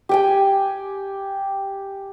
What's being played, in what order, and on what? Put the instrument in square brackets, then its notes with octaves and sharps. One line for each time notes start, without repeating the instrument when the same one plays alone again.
[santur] G4 G5 G#5